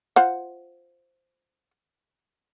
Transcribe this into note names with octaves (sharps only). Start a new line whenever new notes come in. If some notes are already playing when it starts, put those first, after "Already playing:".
F4 C5 F#5